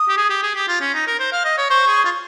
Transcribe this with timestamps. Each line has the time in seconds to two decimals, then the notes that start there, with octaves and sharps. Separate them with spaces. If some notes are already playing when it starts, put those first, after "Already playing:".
Already playing: D#6
0.09 G4
0.17 G#4
0.30 G4
0.43 G#4
0.55 G4
0.68 F4
0.81 C#4
0.94 D#4
1.07 A#4
1.20 C5
1.32 F5
1.44 D#5
1.58 C#5
1.70 C5 C#6
1.87 G#4
2.04 F4